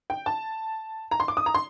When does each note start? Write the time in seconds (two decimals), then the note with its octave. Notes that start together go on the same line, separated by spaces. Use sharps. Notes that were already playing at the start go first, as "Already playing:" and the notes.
0.10 G5
0.26 A5
1.11 A#5
1.20 C6
1.28 D6
1.37 D#6
1.46 A#5
1.55 C6